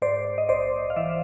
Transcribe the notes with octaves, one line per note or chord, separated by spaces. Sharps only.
G#2 C5 D5
D#5
A#1 C5 D5
F5
E3 D5 E5